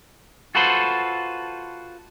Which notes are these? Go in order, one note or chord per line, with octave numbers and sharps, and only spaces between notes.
F4 F#4 A4 B4 C5